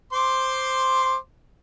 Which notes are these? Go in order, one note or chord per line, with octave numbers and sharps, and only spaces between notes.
C5 C6 D6